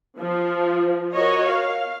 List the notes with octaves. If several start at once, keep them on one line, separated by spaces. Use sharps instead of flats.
F3
F#4 A#4 C#5 D#5
F5